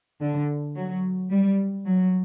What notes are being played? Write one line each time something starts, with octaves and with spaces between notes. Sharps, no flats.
D3
F#3
G3
F#3